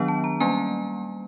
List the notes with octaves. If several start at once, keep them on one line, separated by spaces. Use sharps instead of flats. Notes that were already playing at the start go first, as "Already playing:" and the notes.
Already playing: D#3 F#3 B3 D4
A5
A#5
G3 A#3 C#4 G#5